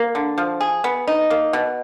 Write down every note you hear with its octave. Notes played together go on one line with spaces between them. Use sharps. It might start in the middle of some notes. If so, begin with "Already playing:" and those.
Already playing: A#3
D3
F3
G#4
B3
D#4
A#3
B2